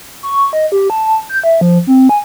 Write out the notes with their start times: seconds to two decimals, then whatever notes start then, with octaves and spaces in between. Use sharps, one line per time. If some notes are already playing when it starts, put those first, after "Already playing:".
0.23 C#6
0.53 D#5
0.72 G4
0.90 A5
1.29 G6
1.43 E5
1.61 F3
1.87 C4
2.09 G#5